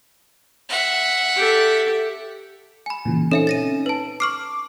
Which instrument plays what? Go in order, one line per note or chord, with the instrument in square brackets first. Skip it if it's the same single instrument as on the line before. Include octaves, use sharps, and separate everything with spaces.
[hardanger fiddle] E5 F#5
[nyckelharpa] G4 A4
[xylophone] G#5 B5
[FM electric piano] A#2 C#3 E3
[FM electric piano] C4 C#4 D#4 [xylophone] A4 E5 G#5
[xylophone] A6 A#6 D#7
B4 A5
[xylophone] C#6 F6 C7 [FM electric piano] D6